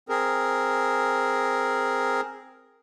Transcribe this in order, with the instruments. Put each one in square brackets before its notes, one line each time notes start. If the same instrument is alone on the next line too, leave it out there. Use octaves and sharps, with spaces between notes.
[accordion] C4 G#4 A#4